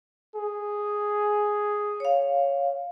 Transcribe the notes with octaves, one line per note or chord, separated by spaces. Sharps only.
G#4
C#5 F5